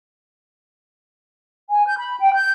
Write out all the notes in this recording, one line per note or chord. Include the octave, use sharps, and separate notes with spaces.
G#5
G6
B5
G5
G6